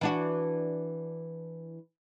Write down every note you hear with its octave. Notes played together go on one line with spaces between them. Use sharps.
E3 D4 F#4